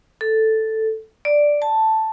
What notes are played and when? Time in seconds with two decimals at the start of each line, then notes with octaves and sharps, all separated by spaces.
0.21 A4
1.25 D5
1.62 A5